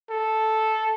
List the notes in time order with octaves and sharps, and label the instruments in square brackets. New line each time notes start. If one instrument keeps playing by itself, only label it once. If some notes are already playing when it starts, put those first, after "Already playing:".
[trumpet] A4